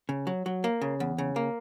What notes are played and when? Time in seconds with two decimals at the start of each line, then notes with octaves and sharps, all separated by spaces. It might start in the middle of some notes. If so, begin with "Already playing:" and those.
0.09 C#3
0.27 F#3
0.46 F#3
0.64 A#3
0.82 C#3
1.00 E2
1.18 C#3
1.36 A#3